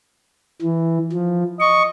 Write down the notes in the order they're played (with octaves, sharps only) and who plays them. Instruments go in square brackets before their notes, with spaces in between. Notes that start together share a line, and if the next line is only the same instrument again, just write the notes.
[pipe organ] E3
F3
[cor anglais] D#5 [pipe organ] C#6